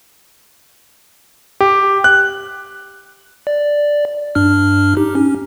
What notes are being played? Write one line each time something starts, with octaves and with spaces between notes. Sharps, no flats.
G4
F#6
D5
G2 D4 F6
D#4 G4
C#4